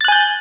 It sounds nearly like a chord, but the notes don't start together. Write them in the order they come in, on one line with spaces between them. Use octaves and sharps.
A6 F#6 G#5 G6